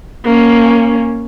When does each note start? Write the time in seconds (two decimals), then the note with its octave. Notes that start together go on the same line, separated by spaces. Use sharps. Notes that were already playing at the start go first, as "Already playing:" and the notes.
0.24 A#3 C#4